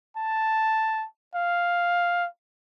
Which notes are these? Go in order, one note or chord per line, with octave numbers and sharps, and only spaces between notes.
A5
F5